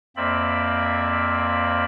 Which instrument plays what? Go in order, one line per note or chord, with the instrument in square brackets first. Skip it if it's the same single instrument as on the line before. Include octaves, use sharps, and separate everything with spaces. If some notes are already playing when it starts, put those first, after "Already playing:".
[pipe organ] F2 A#3 C4 D5 E5 B5